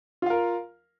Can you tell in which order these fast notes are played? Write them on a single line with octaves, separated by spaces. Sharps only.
F4 F5 A#4